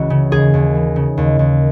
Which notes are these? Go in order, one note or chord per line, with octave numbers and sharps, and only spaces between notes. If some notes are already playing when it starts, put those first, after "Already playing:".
Already playing: C#2 E3 F#4
C#3
D#2 G#4
D#2
E3
C#3
D#2
D#2